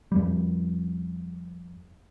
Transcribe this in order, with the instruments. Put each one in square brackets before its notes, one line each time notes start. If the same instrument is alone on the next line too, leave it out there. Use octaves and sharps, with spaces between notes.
[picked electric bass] F2 G3